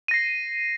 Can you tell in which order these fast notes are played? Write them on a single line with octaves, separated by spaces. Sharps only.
D#7 A#6 C7